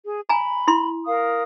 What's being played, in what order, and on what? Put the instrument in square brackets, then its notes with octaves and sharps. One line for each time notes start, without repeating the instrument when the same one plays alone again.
[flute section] G#4
[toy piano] G#5 A#5 [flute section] B5
[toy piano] E4 C6
[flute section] A#4 F5 D#6